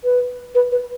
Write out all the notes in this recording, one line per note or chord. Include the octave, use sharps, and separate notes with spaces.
B4
B4
B4